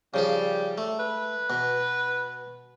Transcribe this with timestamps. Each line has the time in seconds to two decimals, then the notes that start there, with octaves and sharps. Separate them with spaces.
0.14 C#3 F3 G3 G#4
0.78 A3
1.00 B4
1.50 B2